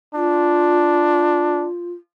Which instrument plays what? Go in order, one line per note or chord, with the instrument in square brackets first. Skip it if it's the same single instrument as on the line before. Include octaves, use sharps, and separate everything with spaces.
[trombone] D4 [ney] F4